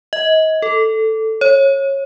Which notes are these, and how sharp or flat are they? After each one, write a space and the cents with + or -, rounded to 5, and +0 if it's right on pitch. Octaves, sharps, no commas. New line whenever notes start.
D#5 +30
A4 +5
C#5 -20